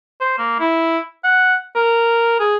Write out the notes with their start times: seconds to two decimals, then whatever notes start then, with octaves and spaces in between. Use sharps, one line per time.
0.21 C5
0.39 A#3
0.60 E4
1.24 F#5
1.76 A#4
2.40 G#4